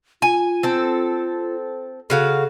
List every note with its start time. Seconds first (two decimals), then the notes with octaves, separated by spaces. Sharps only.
0.22 F4 G#5
0.63 C4 A4
2.10 C#3 F#4 A4 F5